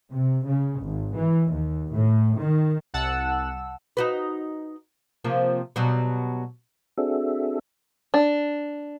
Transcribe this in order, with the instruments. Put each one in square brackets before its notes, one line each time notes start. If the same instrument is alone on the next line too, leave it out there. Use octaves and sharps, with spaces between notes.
[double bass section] C3
C#3
G#1
E3
D#2
A2
D#3
[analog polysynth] C2 F#5 A5 E6
[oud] D#4 F#4 B4
C3 F3 A#3
B2 F#3 G3
[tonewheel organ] C4 D4 F#4 G#4 A4 E5
[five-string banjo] D4